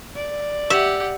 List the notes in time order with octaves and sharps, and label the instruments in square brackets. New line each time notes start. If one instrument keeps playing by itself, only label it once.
[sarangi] D5
[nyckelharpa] G4 F#5 [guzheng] E5